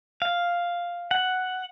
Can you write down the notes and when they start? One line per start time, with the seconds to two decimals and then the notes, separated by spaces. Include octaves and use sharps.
0.22 F5
1.11 F#5